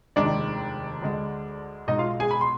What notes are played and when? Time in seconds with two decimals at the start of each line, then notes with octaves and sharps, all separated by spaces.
0.16 F1 D#2 D#3 G#3 D4 D5
1.02 D2 D3 G#3
1.88 B1 B2 G#3 D#4 D#5
1.98 F4 F5
2.20 G#4 G#5
2.31 B5
2.41 C6